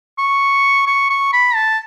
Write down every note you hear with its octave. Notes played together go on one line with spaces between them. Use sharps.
C#6
C#6
C#6
B5
A5